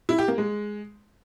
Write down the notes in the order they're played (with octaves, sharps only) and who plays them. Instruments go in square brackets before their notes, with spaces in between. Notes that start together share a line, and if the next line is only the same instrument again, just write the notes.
[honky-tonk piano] E4
G4
A#3
G#3